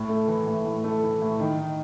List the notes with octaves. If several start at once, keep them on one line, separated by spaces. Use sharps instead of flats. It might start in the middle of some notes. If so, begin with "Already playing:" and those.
Already playing: A2
A3
E3
A2
A2
A3
E3
A2
D#3
D#4